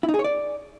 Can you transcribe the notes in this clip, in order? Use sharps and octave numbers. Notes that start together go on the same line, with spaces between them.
E4
D#4
G#4
C#5
D5